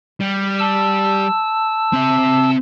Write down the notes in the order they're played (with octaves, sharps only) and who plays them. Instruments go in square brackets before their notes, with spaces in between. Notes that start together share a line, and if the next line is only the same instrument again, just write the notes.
[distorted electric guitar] G3
[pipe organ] A5 E6
[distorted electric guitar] C4 E5